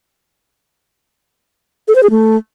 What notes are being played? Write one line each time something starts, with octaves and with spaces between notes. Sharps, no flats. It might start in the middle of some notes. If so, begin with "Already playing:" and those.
A4
C5
G#4
A3